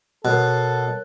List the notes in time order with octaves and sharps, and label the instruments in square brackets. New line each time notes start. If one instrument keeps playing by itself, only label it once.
[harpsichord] B2 [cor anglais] A4 [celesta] A#4 C#5 F#6